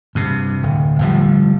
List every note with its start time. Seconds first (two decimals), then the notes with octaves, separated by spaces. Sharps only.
0.15 G2 C3
0.63 D1
0.99 G1 A2 F3 G3